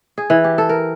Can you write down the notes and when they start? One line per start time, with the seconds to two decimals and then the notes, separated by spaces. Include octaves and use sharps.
0.18 G#4
0.30 E3
0.44 G4
0.58 A4
0.69 A#4